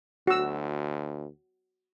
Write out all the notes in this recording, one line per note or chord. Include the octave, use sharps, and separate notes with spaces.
D2 F#4 E6